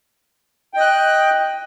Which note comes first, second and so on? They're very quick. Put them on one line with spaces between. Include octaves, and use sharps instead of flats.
G5 D#5 F#6